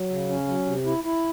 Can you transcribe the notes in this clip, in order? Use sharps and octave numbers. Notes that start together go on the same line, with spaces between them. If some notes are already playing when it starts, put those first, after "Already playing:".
Already playing: F#3
C#3
C#4
F#3
C3
E4
E4